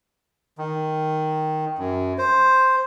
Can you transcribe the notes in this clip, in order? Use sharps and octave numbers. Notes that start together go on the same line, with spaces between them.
D#3
F#2
C5